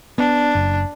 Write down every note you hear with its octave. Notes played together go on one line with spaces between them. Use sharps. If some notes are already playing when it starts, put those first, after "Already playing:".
B3 D4
F#1